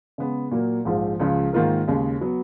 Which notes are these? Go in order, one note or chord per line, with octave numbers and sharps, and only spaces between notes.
C#3 G#3 B3
A#2 F#3 A#3
A#1 G#2 F3 G#3
C#2 C#3 F3
G#2 D#3 A#3 F4 A#4
D#2 C#3 G#3
F#3 B3